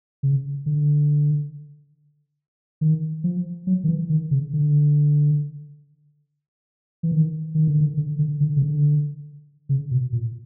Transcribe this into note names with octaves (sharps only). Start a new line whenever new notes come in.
C#3
D3
D#3
F3
F#3
D#3
E3
D#3
C#3
D3
E3
D#3
D#3
D3
D#3
D3
D3
D3
C#3
D3
C#3
B2
A#2